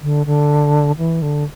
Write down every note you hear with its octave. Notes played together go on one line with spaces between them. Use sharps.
D3
D3
E3
D3